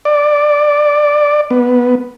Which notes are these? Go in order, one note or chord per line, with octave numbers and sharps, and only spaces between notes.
D5
B3